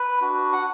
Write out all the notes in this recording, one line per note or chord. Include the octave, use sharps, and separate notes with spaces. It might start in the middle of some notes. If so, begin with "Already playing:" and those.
Already playing: B4
D4 F#4
F#5